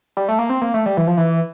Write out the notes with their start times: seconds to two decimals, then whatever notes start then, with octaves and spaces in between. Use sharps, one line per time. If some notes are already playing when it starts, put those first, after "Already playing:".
0.17 G3
0.28 A3
0.39 A#3
0.50 C4
0.62 A#3
0.74 A3
0.86 G3
0.97 E3
1.07 F3
1.17 E3